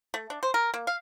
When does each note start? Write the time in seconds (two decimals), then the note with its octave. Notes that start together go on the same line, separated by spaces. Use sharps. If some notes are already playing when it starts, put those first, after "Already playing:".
0.14 A3
0.30 D4
0.43 C5
0.54 A#4
0.74 A#3
0.87 F5